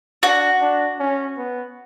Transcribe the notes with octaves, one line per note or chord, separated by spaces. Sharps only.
D4 F#4
D4
C#4
B3